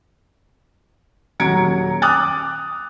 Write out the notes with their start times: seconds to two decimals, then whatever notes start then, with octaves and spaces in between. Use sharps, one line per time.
1.40 D#1 F#3 A#5 G#6 C#7 D7
2.02 D6 D#6 F6 F#6 A6